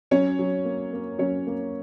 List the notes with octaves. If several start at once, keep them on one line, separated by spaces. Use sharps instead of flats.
F#3 C#4 C#5
F#3
A#3
A#3
F#3 C#4 C#5
A#3